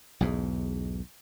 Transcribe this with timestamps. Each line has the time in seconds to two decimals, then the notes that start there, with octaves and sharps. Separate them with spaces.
0.21 B1 E2 G#2